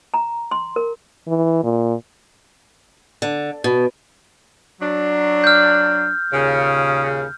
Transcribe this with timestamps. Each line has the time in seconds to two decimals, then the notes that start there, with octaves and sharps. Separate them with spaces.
0.14 A#5
0.51 C6
0.76 A#4
1.28 E3
1.63 A#2
3.22 D3
3.64 B2
4.81 F#3 D4
5.44 F6 G6
6.32 D#2 A#2 C#3